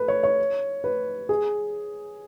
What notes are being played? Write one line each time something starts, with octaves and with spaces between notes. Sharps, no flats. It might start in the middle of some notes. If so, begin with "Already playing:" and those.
Already playing: A4 B4
C#5
C#5
B4
G#4